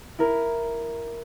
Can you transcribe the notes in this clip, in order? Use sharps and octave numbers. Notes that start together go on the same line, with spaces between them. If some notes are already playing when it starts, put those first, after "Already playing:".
E4 A#4